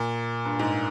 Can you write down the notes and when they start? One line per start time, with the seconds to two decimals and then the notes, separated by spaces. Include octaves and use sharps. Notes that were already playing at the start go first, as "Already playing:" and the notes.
Already playing: A#2
0.45 G2
0.59 G#2